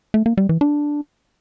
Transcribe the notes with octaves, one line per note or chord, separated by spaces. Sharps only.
A3
A#3
G3
E3
D4